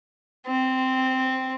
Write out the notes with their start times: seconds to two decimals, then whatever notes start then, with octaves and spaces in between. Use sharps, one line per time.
0.46 C4